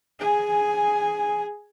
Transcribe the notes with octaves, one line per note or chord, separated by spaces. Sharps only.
G#4 G#5